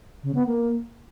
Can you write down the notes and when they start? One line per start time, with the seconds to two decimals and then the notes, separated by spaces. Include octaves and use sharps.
0.23 C#3
0.35 B3
0.46 A#3